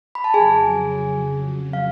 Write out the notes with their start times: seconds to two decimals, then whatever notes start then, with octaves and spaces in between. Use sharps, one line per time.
0.15 B5
0.24 A5
0.34 F2 C#3 F#3 G#4 G#5
1.73 F5